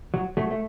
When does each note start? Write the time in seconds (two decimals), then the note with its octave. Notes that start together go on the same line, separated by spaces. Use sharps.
0.14 F#3
0.37 F#3 A3
0.51 A3